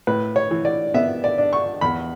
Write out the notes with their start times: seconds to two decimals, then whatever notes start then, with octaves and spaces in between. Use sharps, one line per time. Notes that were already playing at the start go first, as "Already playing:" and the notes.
0.07 A2 B4
0.36 C#5
0.51 E3
0.65 D5
0.94 B3 E5
1.24 D5
1.38 D4
1.53 C#6
1.81 E2 B5